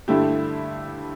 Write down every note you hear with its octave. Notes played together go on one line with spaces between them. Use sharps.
G2 D3 A3 E4 G4